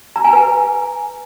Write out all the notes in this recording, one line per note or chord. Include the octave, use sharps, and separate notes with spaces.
A#5
G#5
B4